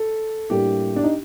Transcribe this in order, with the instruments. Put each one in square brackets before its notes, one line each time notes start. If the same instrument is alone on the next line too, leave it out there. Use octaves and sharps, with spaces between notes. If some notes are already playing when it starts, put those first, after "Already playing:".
Already playing: [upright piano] A4
A2 G3 A#3 D4 G4
D4
D#4